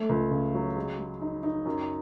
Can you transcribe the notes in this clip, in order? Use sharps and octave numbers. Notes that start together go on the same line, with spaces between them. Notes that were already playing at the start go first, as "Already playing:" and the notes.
Already playing: A3
C#2
C#3
F#3
G#3
G#3
D#4
D#4
F#2